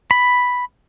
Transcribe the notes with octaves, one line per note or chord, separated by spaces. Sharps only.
B5